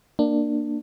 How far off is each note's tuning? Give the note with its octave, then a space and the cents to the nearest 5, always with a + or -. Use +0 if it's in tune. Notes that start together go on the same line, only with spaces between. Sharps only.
A#3 +0 D4 +15